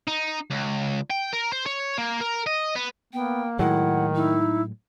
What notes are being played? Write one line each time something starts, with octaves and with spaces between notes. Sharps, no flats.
D#4
C#2
G5
A#4
C5
C#5
A#3
A#4
D#5
B3
A#3 B3 G5
A2 D#3 F#3 G#3 E4 F#5
D#4 E4